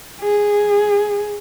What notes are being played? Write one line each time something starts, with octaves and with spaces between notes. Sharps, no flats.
G#4